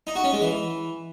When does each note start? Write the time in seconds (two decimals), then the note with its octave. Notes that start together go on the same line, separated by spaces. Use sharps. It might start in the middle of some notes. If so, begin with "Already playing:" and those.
0.07 D#4
0.15 F#4
0.24 C#4
0.33 G#3
0.41 E3